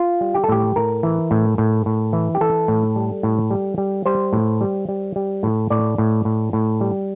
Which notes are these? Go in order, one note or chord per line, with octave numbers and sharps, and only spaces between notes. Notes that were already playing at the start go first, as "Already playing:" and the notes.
Already playing: F4
G3
G4
A4
A2 G4
A2 A#4
E3
A2
A2
A2
E3
G4
E3 A4
A2
G3
A2
G3
G3
G3 C5
A2
G3
G3
G3
A2
A2 D5
A2
A2
A2
G3